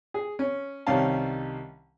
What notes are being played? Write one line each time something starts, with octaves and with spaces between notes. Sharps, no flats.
G#4
C#4
C2 D#3 G3 C#4 F5 A5